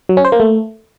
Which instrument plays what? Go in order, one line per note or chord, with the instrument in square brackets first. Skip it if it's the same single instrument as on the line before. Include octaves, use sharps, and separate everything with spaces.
[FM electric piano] F#3
C#4
C5
A#3
A3